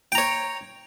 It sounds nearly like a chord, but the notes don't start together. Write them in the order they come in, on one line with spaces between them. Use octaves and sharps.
G5 A#5 C#5